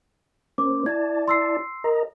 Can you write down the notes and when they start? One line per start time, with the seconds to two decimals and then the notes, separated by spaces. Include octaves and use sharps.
0.58 A#3 C#4 C5 D6
0.86 E4 D5 A5 G#6
1.28 C6 E6 C7
1.84 A#4 D#5 A#5